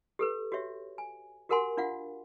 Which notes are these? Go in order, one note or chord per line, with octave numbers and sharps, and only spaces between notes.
G4 A4 B4
F#4 G4 C#5 E5
G#5
F#4 G4 A#4 F#5 G#5 C6
D4 F4 F5 F#5